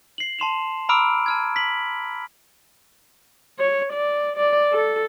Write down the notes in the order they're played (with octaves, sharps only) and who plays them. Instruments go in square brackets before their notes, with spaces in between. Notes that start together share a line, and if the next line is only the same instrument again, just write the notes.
[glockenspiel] C7 F#7
A5 C6 E7 F7
A#5 B5 D6 E6 F6 D7
A5 F6 G#6
B6 F#7
[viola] C#5
D5
D5
A4